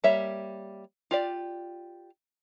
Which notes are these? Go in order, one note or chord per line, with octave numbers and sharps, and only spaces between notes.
G3 A#3 C#5 E5
F4 G4 D5